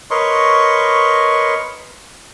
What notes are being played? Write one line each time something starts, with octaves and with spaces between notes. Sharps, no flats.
A#4 B4 C#5 D#5 C6 C#6